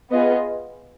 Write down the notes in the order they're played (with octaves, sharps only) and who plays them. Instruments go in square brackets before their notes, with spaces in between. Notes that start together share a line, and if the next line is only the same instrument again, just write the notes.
[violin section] B3 F4 G#4 D#5